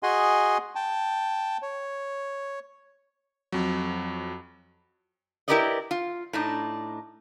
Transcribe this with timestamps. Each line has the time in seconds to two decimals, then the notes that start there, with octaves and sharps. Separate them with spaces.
0.03 F#4 G#4 D#5 F#5 G#5 C6
0.75 G5 A5
1.62 C#5
3.52 F2 F#3
5.48 E4 G4 A#4 B4 D5 D#5
5.91 F4
6.33 A2 D4 D#4